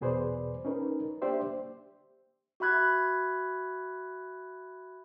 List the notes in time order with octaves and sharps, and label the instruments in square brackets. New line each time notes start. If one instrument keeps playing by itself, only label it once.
[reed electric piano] E2 B2 G#4 B4 C5 D5
C#4 D#4 A#4 B4
A#3 D4 G4 C5 D5 E5
[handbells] F#4 E5 B5 F#6 G#6